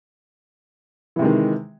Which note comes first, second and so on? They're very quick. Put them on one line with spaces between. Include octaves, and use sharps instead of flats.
E3 C3 G#3 D#3